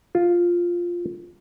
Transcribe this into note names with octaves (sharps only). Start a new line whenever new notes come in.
F4